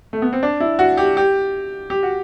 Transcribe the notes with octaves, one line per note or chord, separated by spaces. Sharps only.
A3
B3
C4
D4
E4
F#4
G4
G4
G4
F#4